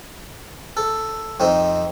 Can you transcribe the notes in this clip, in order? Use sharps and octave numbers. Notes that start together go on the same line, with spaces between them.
A4
F2 C4 D#4